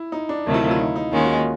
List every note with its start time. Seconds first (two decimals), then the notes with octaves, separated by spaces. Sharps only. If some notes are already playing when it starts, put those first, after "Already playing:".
Already playing: E4
0.12 D#4
0.29 D4
0.46 D2 C3 D#3 F#3 A3
0.54 E4
0.63 F4
0.71 E4
0.79 D#4
0.96 D#4
1.12 D#2 D#3 G#3 C#4 F4
1.23 F#4
1.35 F4